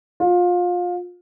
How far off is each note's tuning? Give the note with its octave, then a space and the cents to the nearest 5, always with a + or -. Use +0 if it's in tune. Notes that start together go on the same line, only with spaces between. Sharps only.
F4 +25